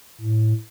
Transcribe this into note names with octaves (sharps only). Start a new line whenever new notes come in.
A2